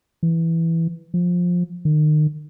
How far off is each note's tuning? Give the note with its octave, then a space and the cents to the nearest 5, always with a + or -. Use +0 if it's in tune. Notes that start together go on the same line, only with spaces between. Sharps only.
E3 +0
F3 +15
D#3 -35